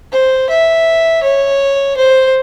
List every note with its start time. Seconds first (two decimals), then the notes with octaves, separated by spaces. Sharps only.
0.12 C5
0.50 E5
1.23 C#5
1.97 C5